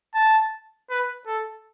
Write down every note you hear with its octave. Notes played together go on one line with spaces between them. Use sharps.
A5
B4
A4